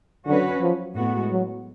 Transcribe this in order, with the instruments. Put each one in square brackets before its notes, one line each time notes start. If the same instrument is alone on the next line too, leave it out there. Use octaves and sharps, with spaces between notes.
[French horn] D3 [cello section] F#3 C#4 F#4 B4
[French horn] F3
[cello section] A2 G#3 B3 F#4
[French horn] F#3